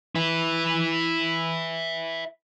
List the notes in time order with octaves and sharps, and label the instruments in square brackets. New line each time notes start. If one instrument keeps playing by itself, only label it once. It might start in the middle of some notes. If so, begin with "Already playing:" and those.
[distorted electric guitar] E4 B4